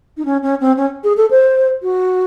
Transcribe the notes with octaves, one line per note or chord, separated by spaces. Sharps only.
D#4
C#4
C#4
C4
C#4
G#4
A4
C5
F#4